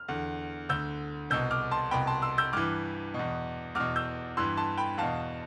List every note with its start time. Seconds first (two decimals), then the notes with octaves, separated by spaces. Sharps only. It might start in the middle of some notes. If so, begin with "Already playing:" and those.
Already playing: F6
0.08 E2 D3
0.69 D2 D3 E6 G6
1.30 C2 B2 E6 G6
1.51 D6 F6
1.71 A5 C6
1.91 C2 B2 G5 B5
2.07 A5 C6
2.22 C6 E6
2.38 E6 G6
2.53 G2 E3 D6 F6
3.14 E2 B2
3.75 E2 B2 D6 F6
3.96 E6 G6
4.37 G2 E3 C6 E6
4.57 A5 C6
4.78 G5 B5
4.98 E2 B2 F5 A5